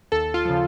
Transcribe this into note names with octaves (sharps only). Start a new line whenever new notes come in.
D#2 A4
F4
C#3 F3